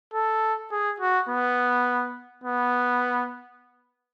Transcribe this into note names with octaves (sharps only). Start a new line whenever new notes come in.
A4
G#4
F#4
B3
B3